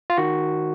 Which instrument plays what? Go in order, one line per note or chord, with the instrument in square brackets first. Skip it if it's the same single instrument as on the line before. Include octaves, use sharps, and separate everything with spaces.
[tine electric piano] F4
D#3 F#4